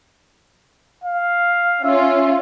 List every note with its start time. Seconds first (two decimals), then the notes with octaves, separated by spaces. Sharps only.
1.04 F5
1.84 C#4 F4 E5